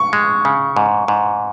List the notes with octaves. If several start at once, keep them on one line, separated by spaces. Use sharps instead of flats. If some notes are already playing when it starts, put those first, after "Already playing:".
Already playing: C#6
G#3
C#3
G#2
G#2